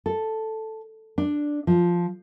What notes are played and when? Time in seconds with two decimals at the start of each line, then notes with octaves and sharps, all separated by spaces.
0.06 A4
1.18 D4
1.67 F3